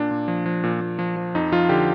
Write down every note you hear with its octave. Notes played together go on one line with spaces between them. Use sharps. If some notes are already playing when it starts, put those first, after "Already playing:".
Already playing: A#2 D4
A#2
F3
F3
A#2
A#2
F3
F3
F2 D#4
F3 F4
D3 G4